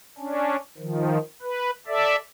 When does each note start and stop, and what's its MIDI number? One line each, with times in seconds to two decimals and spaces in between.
0.18 0.56 61
0.18 0.56 62
0.78 1.18 51
0.78 1.18 53
1.42 1.70 71
1.87 2.16 69
1.87 2.16 74
1.87 2.16 76